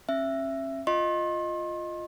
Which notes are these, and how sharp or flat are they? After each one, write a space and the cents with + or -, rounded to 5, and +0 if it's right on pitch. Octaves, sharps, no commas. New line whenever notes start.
C#4 -40 E5 +15
F4 +0 D#5 +0 C6 +40